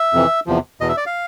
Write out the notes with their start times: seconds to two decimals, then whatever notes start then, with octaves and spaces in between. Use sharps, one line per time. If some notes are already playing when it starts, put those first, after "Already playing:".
Already playing: E5
0.13 F2 C3 E3
0.46 E2 C3 F3
0.81 E2 B2 D#5
0.89 E5
0.97 D5
1.06 F5